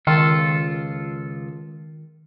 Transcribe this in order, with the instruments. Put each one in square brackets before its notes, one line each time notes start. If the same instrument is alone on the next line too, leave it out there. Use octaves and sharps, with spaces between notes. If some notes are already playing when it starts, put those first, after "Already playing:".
[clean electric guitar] C#2 F4 A4 [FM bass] D#3